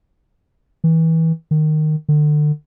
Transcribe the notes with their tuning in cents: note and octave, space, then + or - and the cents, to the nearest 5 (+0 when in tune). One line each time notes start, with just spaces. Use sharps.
E3 -25
D#3 -15
D3 +35